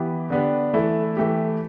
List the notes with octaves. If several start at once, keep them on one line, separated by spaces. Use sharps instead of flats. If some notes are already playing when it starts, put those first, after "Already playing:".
Already playing: E3 B3 G4
D3 B3 D4 G4
E3 A3 E4 A4
E3 A3 G4